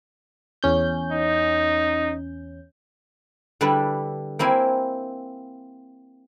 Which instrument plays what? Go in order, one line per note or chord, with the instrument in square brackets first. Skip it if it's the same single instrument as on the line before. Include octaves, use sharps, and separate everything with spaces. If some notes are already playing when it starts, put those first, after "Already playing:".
[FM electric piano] E2 C#4 G6
[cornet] D#4
[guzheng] D3 G3 D4 E4 B4
A#3 C4 E4 F5 G#5